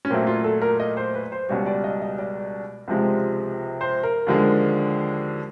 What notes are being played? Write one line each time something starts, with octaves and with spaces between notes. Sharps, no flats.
C#4
A#2 F#3 A3 C4
F4
A4
A#4
D#5
C5
B4
C5
C#2 B2 G3 C#5
D5
D#5
D#5
D5
C#2 C3 F3 G#3
C5
A#4
D#2 D3 F3 G#3